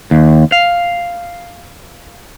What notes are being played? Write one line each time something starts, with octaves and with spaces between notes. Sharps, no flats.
D#2
F5